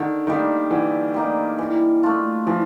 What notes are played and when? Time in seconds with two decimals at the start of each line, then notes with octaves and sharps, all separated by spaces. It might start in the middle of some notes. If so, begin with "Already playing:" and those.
Already playing: D3 D#3
0.27 D#3 G3 A#3 D#4
0.71 D3 E3
1.14 G3 A#3 D#4
1.59 E3
2.03 A3 D4 F4
2.47 E3 F3